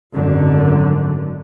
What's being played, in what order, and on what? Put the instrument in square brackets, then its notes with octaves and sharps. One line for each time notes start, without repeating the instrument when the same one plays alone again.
[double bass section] G#1 F#2 D3